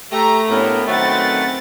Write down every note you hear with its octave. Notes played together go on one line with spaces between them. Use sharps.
A3 G4 A#5
A2 A#3 B3 C#4 D4 A#4
D#3 F#3 A3 C4 C#4 B4 F#5 A6